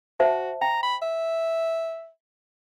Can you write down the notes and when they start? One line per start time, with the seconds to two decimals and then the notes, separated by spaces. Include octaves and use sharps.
0.20 F#4 C5 E5 A5
0.61 G5 A#5
0.83 B5
1.02 E5